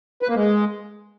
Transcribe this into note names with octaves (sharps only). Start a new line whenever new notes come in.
B4
A#3
G#3